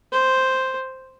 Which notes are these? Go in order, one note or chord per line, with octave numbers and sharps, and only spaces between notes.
C5